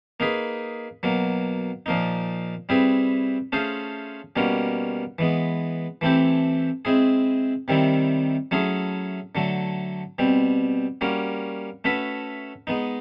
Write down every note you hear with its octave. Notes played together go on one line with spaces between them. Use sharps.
A#3 D#4 G#4 B4
B2 F#3 A#3
A#2 F3 A#3 D#4
G3 C4 E4 G#4 B4
A3 C#4 F4 G#4 C5
B2 G3 A#3 C#4 F#4
E3 G#3 B3
E3 A3 C4 E4 G4
G#3 C4 E4 G#4
C3 D#3 G3 C4 E4
F#3 A3 C#4 E4 G#4
D3 F#3 A3
B2 G3 C4
G3 A#3 C#4 F#4
A3 C#4 F#4 B4 E5
G#3 B3 D#4